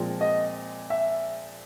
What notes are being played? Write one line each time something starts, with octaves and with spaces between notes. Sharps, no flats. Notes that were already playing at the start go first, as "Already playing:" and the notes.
Already playing: A#2 F3 G#3 C4
D#5
E5